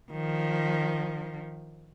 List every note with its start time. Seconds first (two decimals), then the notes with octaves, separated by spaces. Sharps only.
0.11 D#3 F3